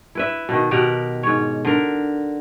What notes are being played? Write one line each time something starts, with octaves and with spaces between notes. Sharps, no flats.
E4 B4 E5
B2 D#3
B2 G4 A#4 F#5
G#2 C#5
D3 A#4